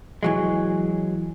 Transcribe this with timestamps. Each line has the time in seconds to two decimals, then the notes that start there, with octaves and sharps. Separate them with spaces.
0.23 E3 F#3 G#3